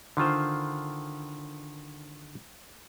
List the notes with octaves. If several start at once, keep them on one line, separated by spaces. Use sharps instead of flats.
D3 D#3 F4 C5